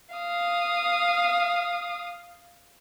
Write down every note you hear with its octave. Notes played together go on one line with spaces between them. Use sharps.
F5 D#6